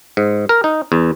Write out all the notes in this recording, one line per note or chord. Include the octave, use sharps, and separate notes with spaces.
G#2
A#4
D#4
E2